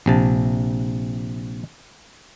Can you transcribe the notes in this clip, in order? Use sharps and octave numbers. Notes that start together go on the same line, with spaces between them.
A#1 C3 A5